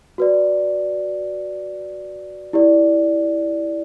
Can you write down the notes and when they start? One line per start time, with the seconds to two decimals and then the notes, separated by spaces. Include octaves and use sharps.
0.18 F#4 B4 D5
2.53 E4 G4 D5